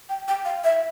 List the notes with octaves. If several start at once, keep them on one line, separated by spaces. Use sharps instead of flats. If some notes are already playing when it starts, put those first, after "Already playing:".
G5
G5
F5
E5